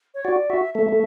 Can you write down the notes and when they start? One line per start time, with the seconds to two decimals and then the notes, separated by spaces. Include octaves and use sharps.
0.14 C#5
0.25 F#4 D5
0.50 F#4 E5
0.74 A3 E5
0.89 A3